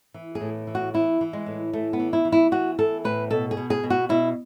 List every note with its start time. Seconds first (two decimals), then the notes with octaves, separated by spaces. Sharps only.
0.14 E3
0.35 G#4
0.41 A2
0.67 E3
0.75 F#4
0.94 E3 E4
1.21 E3
1.33 G#3
1.46 A2
1.73 E3 A3
1.93 B3
1.99 E3
2.13 E4
2.25 E3
2.32 E4
2.52 E3 F#4
2.79 E3 A4
3.04 A2 B4
3.31 B2 A4
3.51 G#4
3.57 B2
3.70 G#4
3.83 B2
3.90 F#4
4.09 B2 E4